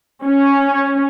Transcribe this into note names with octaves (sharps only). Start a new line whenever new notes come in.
C#4